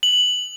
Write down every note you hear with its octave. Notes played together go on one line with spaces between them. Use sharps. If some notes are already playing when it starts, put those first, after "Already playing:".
F#7